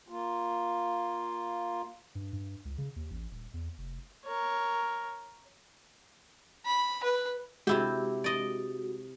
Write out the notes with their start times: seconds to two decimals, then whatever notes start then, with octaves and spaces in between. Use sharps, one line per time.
0.08 A#3 F4
2.15 G2
2.33 G2
2.65 C#2
2.78 C#3
2.96 D#2
3.11 A1
3.31 D#1
3.54 E2
3.78 F1
4.26 A#4 C#5
6.66 B5
7.04 B4
7.67 C3 G#3 E4 F#4 G4
8.24 D5 D#5